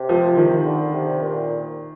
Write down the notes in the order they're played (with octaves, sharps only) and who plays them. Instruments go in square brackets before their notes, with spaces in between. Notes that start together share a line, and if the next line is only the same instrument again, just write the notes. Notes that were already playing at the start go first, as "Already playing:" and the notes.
Already playing: [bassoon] C3
[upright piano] F3
D#3
[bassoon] D3
C3
A#2